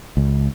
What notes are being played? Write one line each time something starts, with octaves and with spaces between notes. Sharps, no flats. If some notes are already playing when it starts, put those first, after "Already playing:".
C#2